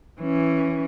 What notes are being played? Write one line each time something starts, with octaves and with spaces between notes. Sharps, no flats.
E3 C#4